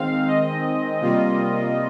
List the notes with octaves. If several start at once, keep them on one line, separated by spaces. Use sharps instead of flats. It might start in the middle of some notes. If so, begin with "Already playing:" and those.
Already playing: D#3 G#3 C4 F5
D#5
C3 G3 A#3 F4